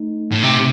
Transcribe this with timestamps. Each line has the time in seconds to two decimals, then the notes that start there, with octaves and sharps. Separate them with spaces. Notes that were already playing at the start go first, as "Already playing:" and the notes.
Already playing: A3 D#4
0.32 A2
0.43 C3